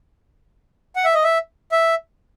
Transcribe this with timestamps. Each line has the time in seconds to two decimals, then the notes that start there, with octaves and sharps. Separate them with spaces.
0.96 F#5
1.05 E5
1.14 D#5
1.24 E5
1.72 E5